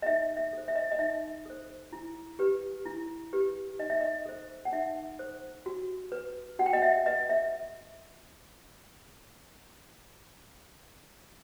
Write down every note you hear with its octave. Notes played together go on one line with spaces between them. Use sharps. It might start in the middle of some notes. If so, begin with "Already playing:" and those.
D#5
D#4 E5
E5
A4 C5
E5
D#5
D#5
D#4 E5
A4 C5
E4
G4 B4
E4
G4 B4
D#4 D#5
E5
D#5
A4 C5
F#5
D#4 E5
A4 C5
F#4
B4
F#4 F#5
G5
D#5 F#5
E5
B4 D#5
E5